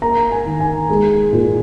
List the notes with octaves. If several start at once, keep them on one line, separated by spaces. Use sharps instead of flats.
A#3 A#5
G#5
D#3
G#5
G#3
A#2